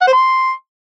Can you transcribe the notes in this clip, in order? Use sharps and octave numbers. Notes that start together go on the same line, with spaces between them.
F#5
C5
C6